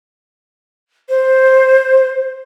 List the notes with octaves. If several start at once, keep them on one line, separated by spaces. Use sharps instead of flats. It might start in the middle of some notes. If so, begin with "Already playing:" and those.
C5